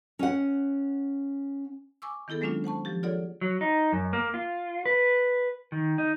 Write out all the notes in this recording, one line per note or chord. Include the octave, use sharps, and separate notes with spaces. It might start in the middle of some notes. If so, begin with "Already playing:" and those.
C#4 F#5
G#5 C#6 D6 E6
D#3 B3 E4 G#4 A4
F#3 G#3 A#3 C#4 D4 F4
C5 F#5 A5 C#6
F3 G4
F4 G#4 A4 C#5 D5 F#5
F#3
D#4
F#2
A#3
F4
B4
D#3
D#4